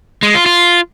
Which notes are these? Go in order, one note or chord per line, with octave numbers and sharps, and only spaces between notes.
G#3
F4
F4